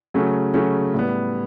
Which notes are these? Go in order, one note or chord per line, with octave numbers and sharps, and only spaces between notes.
C#3 F#3 A3 C#4
C#3 F#3 A3 C#4
A2 G3 B3